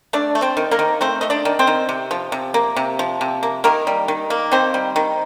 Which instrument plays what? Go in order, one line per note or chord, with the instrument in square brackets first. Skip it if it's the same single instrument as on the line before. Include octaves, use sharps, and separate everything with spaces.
[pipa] A3 D4 D5
A3
C4 C5
D#3
A#3 A#4
D#3
A3 C4 C5
A3 D#5
D4 D5
D#3
C4 C5
D#3
C3
F3
C3
A#3
C3
F3
C3
A#3
D#3 A#3 A#4
G3
D#3
A#3
D#3 C4 C5
G3
D#3